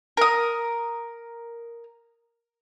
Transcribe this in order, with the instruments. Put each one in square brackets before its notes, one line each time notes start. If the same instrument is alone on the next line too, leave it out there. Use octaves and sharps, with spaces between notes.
[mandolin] A#4 D#6